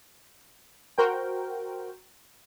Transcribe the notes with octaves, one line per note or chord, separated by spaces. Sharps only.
F#4 A#4 C5 G5